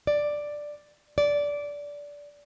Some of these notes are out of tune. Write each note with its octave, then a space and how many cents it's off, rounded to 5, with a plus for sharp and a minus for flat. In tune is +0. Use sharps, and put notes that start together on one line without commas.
D5 +5
D5 -15